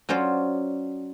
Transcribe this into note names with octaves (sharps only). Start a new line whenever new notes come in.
F#3 C#4 F4 C5 D5